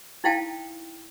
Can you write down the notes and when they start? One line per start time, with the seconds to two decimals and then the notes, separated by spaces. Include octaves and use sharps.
0.24 D#4 E4 F5 G5 A5